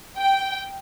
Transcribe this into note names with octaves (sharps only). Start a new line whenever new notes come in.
G5